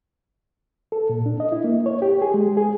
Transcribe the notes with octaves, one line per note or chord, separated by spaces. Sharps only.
A4
A#2
D4
D#5
E4
A#3
C#5
G4
G#4
G#3
G#4